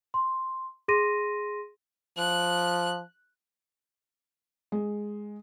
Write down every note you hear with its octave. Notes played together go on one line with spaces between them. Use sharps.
C6
G#4 C6 A#6 D#7
F3 F#6
G#3